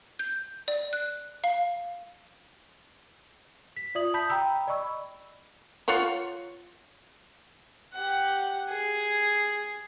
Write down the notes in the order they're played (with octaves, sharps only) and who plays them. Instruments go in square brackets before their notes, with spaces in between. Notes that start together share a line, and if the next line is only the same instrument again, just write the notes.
[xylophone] G6
D5
F#6
F5
[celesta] B6
F4 D5 E5 D#6 F#7
A5 B5 D#6 G6 B6
G5 A#5 B5 E6
D5 D#5 B5 C#6 E6
[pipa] F4 C#5 F#5 C#6
[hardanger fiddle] G4 F#5
G#4